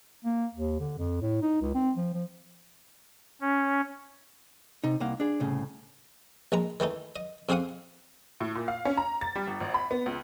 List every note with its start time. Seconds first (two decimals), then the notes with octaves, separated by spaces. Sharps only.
0.25 A#3
0.55 D#2
0.80 D3
0.99 F2
1.22 A2
1.42 D#4
1.62 C#2
1.75 C4
1.97 F3
2.14 F3
3.41 C#4
4.84 C3 D#4
5.00 C2 A#3 F5 F#5
5.20 D4 G#4
5.40 C2 A2 C#3
6.52 A#1 G#3 A#5
6.80 D#3 E3 A3 D#4
7.16 D#5
7.49 F2 C4 G#4 F5 F#5 D#6
8.40 A2
8.55 A#2
8.68 F5
8.85 C#4
8.97 A#5
9.21 A6
9.35 G3
9.47 G1
9.60 G#1
9.74 B5
9.91 B3
10.06 C#2